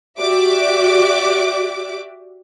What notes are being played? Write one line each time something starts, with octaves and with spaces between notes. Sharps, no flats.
F#4 G4 D5 E5 D6